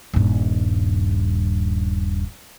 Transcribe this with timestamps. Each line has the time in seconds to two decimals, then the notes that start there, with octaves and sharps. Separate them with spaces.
0.13 D#1 G2